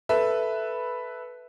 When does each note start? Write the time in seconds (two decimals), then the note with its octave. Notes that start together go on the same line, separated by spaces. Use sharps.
0.09 A4 B4 E5